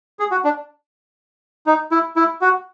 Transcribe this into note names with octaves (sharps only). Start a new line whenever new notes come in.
G#4
F#4
D4
D#4
E4
E4
F#4